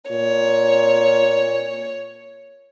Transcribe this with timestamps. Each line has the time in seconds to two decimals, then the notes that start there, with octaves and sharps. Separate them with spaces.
0.10 A#2 C#5